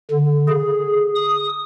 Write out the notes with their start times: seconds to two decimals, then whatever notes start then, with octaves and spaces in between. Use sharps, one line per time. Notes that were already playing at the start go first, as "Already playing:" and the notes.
0.10 D3
0.48 G#4
1.15 D#6